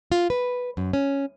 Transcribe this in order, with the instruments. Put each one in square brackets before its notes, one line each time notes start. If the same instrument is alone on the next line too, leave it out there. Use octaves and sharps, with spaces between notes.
[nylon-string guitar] F4
B4
F#2
C#4